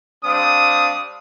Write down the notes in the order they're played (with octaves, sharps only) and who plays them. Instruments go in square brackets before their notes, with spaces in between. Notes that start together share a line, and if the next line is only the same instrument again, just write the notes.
[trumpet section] G3 C4 D4 F5 D#6